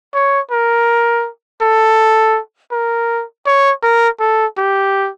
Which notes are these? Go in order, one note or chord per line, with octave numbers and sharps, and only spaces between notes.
C#5
A#4
A4
A#4
C#5
A#4
A4
G4